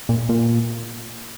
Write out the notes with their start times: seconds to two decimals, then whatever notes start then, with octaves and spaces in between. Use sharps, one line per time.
0.09 A#2
0.29 A#2